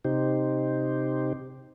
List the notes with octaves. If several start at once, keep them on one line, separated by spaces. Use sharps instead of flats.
C3 D#4 G4 C5